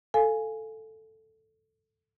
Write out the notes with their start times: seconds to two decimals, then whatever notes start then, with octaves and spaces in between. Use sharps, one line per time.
0.14 A4 F5 G#5